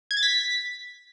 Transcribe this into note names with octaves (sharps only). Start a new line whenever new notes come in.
G#6
A6
B6